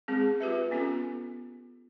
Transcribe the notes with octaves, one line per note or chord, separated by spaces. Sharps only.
G#3 C4 G#4
F4 G4 B4 E5
B3 C#4 F4 A4